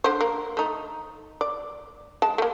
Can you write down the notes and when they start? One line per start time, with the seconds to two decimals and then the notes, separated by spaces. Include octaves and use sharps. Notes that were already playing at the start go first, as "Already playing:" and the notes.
0.04 D3 C5
0.21 A#3
0.57 A3 D#4
1.41 D5
2.22 G#3 A5
2.38 A3 A#3